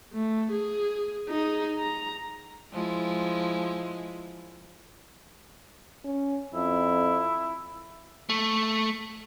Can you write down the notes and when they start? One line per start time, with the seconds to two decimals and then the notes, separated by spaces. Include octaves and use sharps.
0.13 A3
0.52 G#4
1.29 D#4 G#4
1.79 A#5
2.73 F3 G#3 E4
6.04 C#4
6.54 F2 E4
8.29 A3